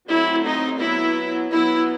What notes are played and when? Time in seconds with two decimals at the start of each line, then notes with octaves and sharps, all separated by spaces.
0.09 F#3 A3 C4 E4
0.45 D#4
0.81 F#3 B3 E4
1.52 F#3 B3 E4